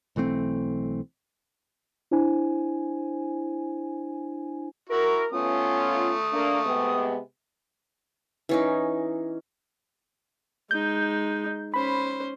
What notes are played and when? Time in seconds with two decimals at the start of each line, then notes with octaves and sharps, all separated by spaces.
0.16 B1 E3 A3 C4
2.11 D4 E4 C5 G#5
4.89 E4 F#4 A#4
5.32 A3 B3 C#4 F4 D#6
6.32 A#3 D4
6.65 C3 G#3 B3
8.49 E3 C#4 D#4
10.71 G#3 D#4 G6
11.74 C#4 C5 B5